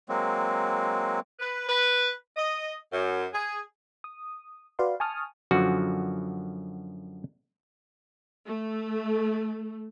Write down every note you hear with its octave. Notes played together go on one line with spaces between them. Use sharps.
F#3 G#3 A#3 C4
B4
B4
D#5
F#2
G#4
D#6
F#4 B4 D5 F5 C6
G#5 A5 C#6 D#6 F6
F#2 D3 F3 F#4
A3